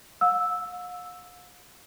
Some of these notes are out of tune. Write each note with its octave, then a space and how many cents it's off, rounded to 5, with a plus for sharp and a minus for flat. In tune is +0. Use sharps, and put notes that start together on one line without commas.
F5 +45 E6 -5